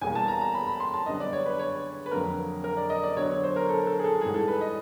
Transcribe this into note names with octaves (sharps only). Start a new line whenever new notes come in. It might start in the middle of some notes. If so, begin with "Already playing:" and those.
E2 B2 G3 A#3 G#5
A5
A#5
A#5
B5
B5
C6
A5
F#2 D3 G3 B3 D4 D#5
D5
C#5
B4
C#5
B4
F2 D3 F#3 A#3 A#4
A#4
D5
D#5
D5
D3 F#3 B3 C#5
C#5
C5
A#4
A4
A4
G#4
A4
G#2 E3 G3 G#4
A4
B4
D#5